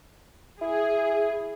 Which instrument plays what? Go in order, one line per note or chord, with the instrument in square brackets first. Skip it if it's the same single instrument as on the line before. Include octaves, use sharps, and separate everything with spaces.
[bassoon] E4 [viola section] G#4